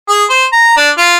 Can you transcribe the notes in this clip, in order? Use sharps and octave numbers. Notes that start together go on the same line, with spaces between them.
G#4
C5
A#5
D4
F4